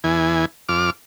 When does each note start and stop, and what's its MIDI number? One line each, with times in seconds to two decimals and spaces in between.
0.04 0.45 40
0.04 0.45 52
0.04 0.45 80
0.69 0.90 41
0.69 0.90 86
0.69 0.90 89